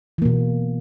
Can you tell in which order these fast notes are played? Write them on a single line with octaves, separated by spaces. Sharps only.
E3 A#3 B2